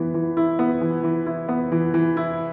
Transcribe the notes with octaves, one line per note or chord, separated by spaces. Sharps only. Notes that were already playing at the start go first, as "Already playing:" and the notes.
Already playing: E3 B3
E3
E4
B3
E3
E3
E4
B3
E3
E3
E4